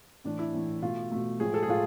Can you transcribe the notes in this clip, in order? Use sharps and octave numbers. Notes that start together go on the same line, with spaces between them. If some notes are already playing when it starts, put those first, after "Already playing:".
A2 E3 A3 D4
E4
A2 E3 A3
B2 A3 F4
B2 A3
A2 F3 G#3 G#4
A4
G#4
A2 F3 G#3 F4